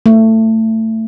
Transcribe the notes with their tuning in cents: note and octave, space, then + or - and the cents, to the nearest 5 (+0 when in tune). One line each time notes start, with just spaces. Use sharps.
A3 +20